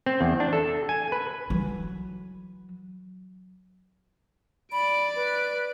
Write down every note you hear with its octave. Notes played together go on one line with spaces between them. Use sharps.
C4
E2
D4
A4
G#5
B4
E3 F#3
D5 B5 D7
B4